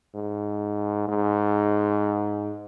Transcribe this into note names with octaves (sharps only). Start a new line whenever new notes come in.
G#2
G#2